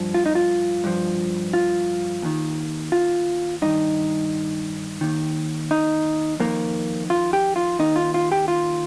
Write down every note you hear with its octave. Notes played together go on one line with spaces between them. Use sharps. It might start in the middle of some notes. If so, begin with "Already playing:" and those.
Already playing: G2 F3
F4
D#4
F4
G2 F3
F4
D#2 D#3
F4
G2 D#3 D#4
D#2 D#3
D#4
F2 D#3 A#3
F4
G4
F4
D#2 D#3 D#4
F4
F4
G4
F4